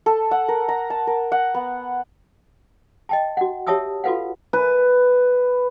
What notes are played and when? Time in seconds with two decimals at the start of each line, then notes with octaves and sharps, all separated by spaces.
0.06 A4
0.31 F#5
0.48 A#4
0.69 A#5
0.90 A5
1.07 A#4
1.32 F#5
1.54 B3
3.09 D#5 G5 A5
3.37 F#4 F#5
3.67 G4 C#5 E5 A5 D#6 E6
4.04 F4 F#4 A4 B4 F5 F#5
4.53 B4